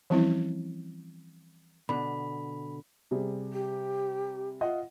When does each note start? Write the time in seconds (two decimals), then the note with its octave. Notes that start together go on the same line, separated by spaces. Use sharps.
0.10 E3 F3 G3 C4 C#4 E4
1.89 B2 D3 B5
3.11 C3 G3 G#4
3.53 G4
4.61 F4 D#5 E5 F#5